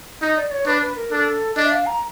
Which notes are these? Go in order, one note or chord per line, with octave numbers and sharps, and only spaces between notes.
D#4 D#5
D5
C#5
D4 B4
B4
A#4
D4 A4
D4 D#5
E5
F5
A#5